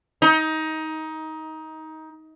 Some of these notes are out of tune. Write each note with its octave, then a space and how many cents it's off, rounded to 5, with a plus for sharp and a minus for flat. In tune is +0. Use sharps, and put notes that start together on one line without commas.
D#4 +20